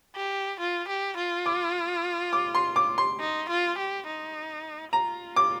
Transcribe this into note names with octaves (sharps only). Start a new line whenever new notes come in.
G4
F4
G4
F4
D6
D6
C6
D6
C6
D#4
F4
G4
D#4
F4 A#5
D6